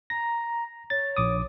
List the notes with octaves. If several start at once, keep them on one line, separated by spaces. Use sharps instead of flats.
A#5 A#6
C#5 A6
A#1 D6 D#6